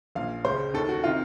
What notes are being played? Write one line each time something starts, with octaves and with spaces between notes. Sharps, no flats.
A#1 A#2 F5
C#2 C#3 C5
D#2 D#3 A4
F#4
C3 D#3 F4